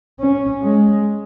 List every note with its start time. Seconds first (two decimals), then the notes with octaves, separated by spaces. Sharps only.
0.20 C#4
0.63 G#3